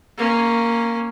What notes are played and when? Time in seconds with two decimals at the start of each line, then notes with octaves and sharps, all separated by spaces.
0.17 A#3 C#4